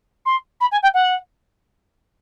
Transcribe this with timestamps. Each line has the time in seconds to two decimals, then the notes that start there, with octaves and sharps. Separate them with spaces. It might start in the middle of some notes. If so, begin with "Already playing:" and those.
0.25 C6
0.60 B5
0.71 G#5
0.82 G5
0.94 F#5